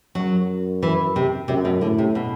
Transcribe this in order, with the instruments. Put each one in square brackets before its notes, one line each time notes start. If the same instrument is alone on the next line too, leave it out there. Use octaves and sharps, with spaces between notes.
[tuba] F#2 [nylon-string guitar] F#3
[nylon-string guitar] E3
C3
[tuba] F#2 [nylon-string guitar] C3
[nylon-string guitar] B2
[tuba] A2 [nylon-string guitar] D3
[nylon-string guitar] C3
B2